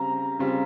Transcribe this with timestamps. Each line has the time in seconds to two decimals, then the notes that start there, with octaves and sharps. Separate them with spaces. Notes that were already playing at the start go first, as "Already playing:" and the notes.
Already playing: C#3 G3 C4 A#5
0.39 C#3 G3 C4 F4